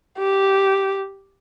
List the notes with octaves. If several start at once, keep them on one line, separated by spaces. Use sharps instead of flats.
G4